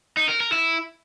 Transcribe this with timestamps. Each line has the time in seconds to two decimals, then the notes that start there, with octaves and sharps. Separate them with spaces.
0.17 D#4
0.29 A#4
0.40 A#4
0.52 E4